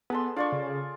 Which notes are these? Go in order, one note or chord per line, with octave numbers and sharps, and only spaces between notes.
B3 G#4 A4 C6
D4 F4 D5 C#6
C#3